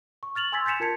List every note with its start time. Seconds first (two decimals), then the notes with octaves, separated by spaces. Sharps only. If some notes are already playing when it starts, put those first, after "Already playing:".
0.23 C#6
0.35 F6 A6 F7 F#7
0.52 G#5 C6 E6 G#6 A6 B6
0.66 G6 A6 B6 C#7 E7 F7
0.80 F4 A#4 A5 G#6 C#7